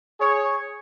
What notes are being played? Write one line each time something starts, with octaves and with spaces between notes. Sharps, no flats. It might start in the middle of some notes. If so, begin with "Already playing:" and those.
G#4 C#5